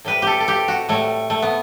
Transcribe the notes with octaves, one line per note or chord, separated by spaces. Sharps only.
A2 G3 B4
G4 A4
A4
G4
F#4
A2 G3 A3
A3
B3